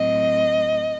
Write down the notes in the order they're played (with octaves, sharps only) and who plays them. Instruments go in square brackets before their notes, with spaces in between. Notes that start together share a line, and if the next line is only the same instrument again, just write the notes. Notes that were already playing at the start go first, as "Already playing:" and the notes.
Already playing: [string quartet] A2 F#3 C4 D#5